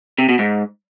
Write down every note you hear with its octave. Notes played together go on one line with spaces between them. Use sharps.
C3
B2
G#2